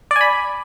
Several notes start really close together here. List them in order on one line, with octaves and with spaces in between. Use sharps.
D5 G#5 B5